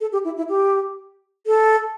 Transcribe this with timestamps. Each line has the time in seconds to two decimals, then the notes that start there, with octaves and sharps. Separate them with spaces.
0.01 A4
0.12 G4
0.25 E4
0.37 E4
0.49 G4
1.46 A4